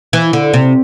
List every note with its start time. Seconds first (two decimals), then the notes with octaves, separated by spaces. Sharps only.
0.13 E3
0.33 D3
0.53 C3